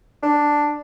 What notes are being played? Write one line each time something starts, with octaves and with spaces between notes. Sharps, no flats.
D4